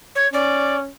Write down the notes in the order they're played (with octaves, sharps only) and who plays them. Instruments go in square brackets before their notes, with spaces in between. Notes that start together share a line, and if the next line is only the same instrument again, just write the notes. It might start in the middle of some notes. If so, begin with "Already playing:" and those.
[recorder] C#5
[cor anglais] C#4 [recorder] D5